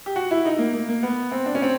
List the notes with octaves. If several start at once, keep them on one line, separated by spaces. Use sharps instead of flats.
G4
F#4
E4
D#4
A#3
A#3
A#3
B3
C4
D4
C#4
C4